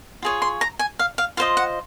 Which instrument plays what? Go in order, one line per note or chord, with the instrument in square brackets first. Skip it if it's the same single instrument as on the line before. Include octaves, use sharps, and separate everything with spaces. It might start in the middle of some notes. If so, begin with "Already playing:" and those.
[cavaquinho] F4 G#4 C#5
C6
A#5
G#5
F5
F5
F4 C5 D#5 F5
F#5